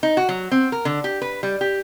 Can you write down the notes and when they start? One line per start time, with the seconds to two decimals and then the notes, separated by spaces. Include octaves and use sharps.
0.03 D#4
0.17 F#4
0.29 F#3
0.51 C4
0.72 A#4
0.85 D3
1.04 G4
1.22 B4
1.43 G3
1.61 G4